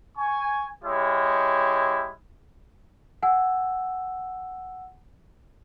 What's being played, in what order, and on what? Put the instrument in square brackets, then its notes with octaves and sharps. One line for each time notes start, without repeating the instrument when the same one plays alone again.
[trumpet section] G#5 C#6
G#3 E4 G4 C#5
[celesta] F#5 G#5 E6